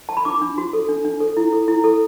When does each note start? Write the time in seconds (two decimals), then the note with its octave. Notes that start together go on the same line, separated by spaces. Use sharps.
0.09 A5
0.17 B5
0.25 D4 D6
0.42 D4
0.58 F#4
0.73 A4
0.89 D4
1.05 D4
1.20 A4
1.37 E4
1.53 A4
1.68 E4
1.84 A4